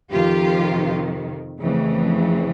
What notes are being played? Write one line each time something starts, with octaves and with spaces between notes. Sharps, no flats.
F2 C3 D#3 F4 G4
F2 C#3 E3 A3